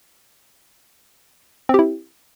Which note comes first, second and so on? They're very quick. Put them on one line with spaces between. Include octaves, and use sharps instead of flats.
C4 G4 E4